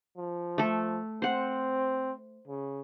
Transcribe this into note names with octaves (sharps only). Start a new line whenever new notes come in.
F3
A3 A4
C4 C5 F#5
C#3